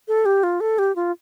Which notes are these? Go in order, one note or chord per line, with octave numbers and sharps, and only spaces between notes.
A4
G4
F4
A4
G4
F4